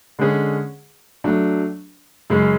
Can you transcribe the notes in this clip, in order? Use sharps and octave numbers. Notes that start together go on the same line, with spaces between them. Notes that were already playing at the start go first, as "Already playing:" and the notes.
D3 G#3 C#4 G#4
F#3 A3 D4
F#2 C#3 G#3 C#4